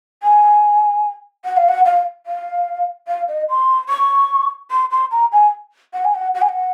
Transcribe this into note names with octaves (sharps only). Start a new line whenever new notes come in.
G#5
F#5
F5
F#5
F5
F5
F5
D#5
C6
C#6
C6
C6
A#5
G#5
F#5
G#5
F#5
F#5
G#5
F#5